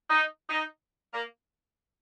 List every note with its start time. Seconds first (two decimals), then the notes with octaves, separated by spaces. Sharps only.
0.10 D#4
0.50 D#4
1.14 A#3